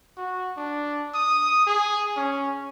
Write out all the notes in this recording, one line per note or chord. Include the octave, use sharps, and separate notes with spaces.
F#4
D4
D#6
G#4
C#4